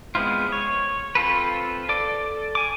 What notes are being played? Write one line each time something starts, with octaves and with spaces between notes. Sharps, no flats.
G#3 B3 C4 E4 F4
C#5
C4 F4 A4 B4
A4 D5 D6
G#5 D6